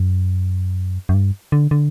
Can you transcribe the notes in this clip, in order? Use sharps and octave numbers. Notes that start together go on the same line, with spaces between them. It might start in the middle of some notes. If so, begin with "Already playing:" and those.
Already playing: F#2
F#2
G2
D3
D3